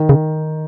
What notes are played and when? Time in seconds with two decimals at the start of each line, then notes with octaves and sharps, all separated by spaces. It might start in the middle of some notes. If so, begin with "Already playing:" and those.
Already playing: D#3
0.09 C#3